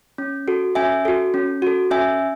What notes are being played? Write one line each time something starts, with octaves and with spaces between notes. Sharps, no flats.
C#4
F#4 A4
C#4 E5 G#5
F#4 A4
C#4
F#4 A4
C#4 E5 G#5